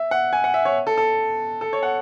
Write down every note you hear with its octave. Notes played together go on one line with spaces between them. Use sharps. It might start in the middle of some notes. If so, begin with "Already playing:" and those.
Already playing: E5
F#5
G#5
F#5
E5
C#5
A4
A4
A4
C#5
F#5